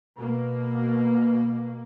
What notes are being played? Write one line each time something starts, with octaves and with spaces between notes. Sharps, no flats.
B2 A#3